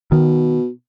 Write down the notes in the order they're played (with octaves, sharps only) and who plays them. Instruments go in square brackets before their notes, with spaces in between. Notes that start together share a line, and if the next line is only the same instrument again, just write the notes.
[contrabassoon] B2 [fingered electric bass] D#3